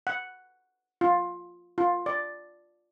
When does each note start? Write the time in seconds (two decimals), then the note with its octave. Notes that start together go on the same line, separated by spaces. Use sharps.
0.07 F#5
1.01 F4
1.78 F4
2.06 D5